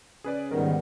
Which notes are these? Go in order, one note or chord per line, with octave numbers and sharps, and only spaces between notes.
C#3 G#4 B4 D5
G#2 D#3 G3 B3 A#4